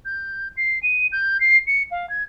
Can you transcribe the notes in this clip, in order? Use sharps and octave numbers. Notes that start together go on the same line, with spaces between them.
G6
C7
D#7
G6
C7
C#7
F5
G#6